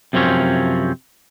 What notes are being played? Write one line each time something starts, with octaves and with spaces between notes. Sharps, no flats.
F#2 C3 F3 C4 C#4